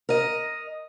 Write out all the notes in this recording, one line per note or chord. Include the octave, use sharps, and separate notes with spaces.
A#4 D#5